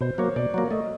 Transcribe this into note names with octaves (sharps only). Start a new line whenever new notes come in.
B2 C5
F#3 A#3 C#5
B2 D5
F#3 A#3
A3 D#5